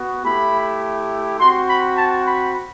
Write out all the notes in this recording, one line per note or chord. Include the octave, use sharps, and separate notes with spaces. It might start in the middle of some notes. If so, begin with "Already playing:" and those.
Already playing: B3 F#4
A3 E4 G4 B5
C4 F#4 C6
B5
A5
B5